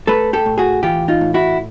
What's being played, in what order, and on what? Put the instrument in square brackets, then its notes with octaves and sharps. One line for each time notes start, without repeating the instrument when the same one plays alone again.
[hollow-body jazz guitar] A3 A4 B4
G4 A4
A2
F#4 G#4
E3 F4 G4
D#4 F4
A2
E4 F#4